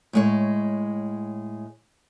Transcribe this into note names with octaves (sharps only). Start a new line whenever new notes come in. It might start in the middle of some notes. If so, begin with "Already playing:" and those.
A2 G#3 C#5